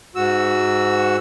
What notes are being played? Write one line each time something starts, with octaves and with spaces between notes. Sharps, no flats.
G#2 F#4 E6